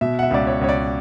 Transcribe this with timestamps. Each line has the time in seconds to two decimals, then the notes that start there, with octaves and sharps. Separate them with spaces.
0.01 B2 E5
0.19 F#5
0.23 E5
0.31 C#2 D5
0.47 C#5
0.61 C#2 C#5
0.69 D5